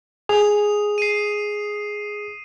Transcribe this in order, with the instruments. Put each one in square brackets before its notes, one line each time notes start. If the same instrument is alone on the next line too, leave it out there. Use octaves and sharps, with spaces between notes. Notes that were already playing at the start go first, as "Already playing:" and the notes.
[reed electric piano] G#4 [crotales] D#6 F7
[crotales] C7 D#7